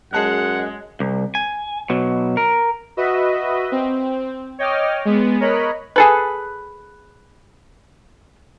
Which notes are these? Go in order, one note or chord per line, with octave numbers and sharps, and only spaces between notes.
F#2 G#3 G#4 F#5 A5 F#6
C2
G#5
B2 F#3
A#4
F#4 B4 D#5 E5
C4
C#5 D#5 G5 D6 F6
G#3 B3
A#4 C#5 D#5 B5 F#6
G#4 A4 B4